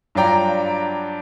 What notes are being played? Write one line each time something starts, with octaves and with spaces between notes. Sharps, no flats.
G2 F#3 F4 D5 G5 A#5